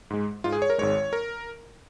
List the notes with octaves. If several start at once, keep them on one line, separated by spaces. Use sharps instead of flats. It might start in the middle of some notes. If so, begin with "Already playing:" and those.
G#2 G#3
G#2 G#3 F4
G#4
C#5
A#4
G#1 G#2 G#3 C#5
A#4